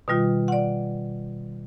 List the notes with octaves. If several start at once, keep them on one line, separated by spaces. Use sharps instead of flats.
B2 D#3 G3 F4
D5 F#5